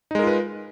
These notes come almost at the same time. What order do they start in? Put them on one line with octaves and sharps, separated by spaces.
D#4 G#3 A#4 F4 B4